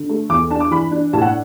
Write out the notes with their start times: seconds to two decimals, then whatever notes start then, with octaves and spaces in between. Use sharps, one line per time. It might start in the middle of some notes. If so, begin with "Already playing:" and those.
Already playing: D3
0.09 A3
0.29 E2 D6
0.51 D4 A5
0.60 D6
0.71 E3 B5
0.91 D4
1.13 A2 A5
1.21 F#5